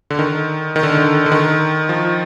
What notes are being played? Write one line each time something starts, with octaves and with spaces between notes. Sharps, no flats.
D3
D#3
D#3
D3
D3
D3
D#3
F3